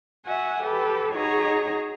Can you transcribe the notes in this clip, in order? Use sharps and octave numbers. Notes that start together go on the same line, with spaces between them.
F#4 E5 F#5 G#5
G4 A4 B4
D#4 F#4 G#4 C#5 A#5